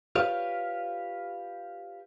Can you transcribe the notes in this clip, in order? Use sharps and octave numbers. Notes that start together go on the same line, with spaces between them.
F4 G4 B4 C#5 D5 F5